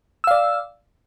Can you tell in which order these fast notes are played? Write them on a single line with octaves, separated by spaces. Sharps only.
E6 F5 D5